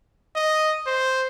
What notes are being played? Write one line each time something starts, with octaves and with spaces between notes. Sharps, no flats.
D#5
C5